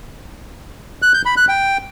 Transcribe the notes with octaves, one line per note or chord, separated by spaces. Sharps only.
F#6
G6
B5
F#6
G5